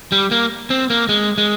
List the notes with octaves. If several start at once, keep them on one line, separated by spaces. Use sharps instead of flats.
G3
A#3
C4
A#3
G#3
G#3